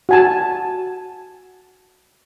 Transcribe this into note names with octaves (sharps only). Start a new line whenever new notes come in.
F#4 G#5 A5